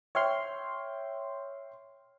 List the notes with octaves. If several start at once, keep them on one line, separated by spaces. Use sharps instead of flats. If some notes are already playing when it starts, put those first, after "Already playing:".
C#5 E5 G5 C6 F6